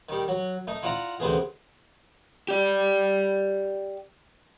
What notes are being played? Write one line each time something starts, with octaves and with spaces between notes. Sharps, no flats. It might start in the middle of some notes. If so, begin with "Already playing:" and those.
D#3 G3
F#3
A3 D#4
E4 F4 D5 F#5 A#5
A1 D2 C3 B3 G#4
G4 D5